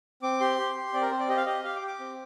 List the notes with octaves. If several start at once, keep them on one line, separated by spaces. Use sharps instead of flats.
C4 D6
G4 C6
G4
G4
C4 D5
A#4
C4 C5
D5
G4 D#5
F5
G4 D#5
G4 F5
D6
G4
D6
C4